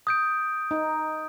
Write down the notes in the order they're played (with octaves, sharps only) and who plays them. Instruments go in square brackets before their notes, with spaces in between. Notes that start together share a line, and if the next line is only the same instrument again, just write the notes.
[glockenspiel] D#6 G6 D7
[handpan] D#4